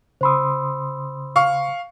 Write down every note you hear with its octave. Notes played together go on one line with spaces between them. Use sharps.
C#3 C5 B5 C6 D#6 E6
F5 C#6